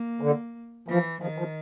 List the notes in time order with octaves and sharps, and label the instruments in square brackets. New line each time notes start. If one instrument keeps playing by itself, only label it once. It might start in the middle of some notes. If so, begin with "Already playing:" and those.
Already playing: [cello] A#3
[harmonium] D3
[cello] E3 [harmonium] F3
[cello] D#3 [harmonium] F3
[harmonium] F3